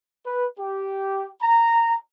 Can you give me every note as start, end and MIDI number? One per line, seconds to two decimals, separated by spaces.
0.23 0.44 71
0.58 1.29 67
1.40 1.95 82